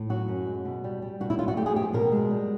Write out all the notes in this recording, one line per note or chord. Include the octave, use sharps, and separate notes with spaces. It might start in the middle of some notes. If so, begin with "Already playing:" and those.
Already playing: A2
F#3 F#4
F#2
G#3
B2
G3
G3
B2 F#4
E4
F#3 F4
F#4
A3 G4
G#4
F3 G4
B2 A#4
G#3
G3